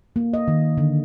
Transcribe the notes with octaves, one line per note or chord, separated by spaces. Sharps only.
A#3
D#5
D#3
D3